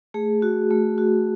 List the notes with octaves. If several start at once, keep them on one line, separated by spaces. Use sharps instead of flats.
A3 G#4
F#4
A3
F#4